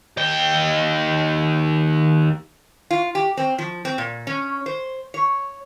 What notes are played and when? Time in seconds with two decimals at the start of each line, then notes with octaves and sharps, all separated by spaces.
0.17 D#2 G5
2.91 F4
3.15 G4
3.37 C4
3.59 F3
3.85 C4
3.98 A#2
4.27 C#4
4.66 C5
5.14 C#5